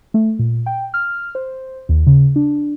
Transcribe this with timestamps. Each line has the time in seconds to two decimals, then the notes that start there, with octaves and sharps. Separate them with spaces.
0.14 A3
0.39 A#2
0.66 G5
0.94 F6
1.35 C5
1.89 D#2
2.07 C#3
2.36 D4